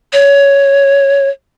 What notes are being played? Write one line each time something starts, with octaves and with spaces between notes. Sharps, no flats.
C#5